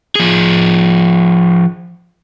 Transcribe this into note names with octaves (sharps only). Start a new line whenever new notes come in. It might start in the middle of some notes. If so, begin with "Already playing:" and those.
F3 G#4